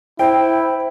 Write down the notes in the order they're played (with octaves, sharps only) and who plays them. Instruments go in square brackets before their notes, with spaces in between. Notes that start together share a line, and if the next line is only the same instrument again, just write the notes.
[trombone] E4 [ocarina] C5 [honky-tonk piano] G5